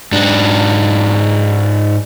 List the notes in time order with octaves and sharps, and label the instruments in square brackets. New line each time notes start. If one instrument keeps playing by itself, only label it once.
[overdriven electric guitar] G#2 D4